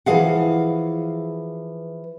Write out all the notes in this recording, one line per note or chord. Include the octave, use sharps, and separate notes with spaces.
E3 F3 G#4 F5 F#5